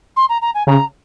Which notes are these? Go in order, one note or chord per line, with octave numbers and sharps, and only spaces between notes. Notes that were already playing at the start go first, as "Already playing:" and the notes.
C6
A#5
A#5
G#5
C#3 A#5